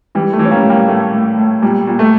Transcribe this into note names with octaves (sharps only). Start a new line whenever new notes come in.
E3 G3
A3
E3
C#4
G3 A#3
A2
G3 A#3
A2 A3
A2
A2
A#2 G3
A#2
A3